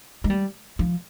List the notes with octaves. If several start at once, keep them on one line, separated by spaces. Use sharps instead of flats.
G#3
G3
F3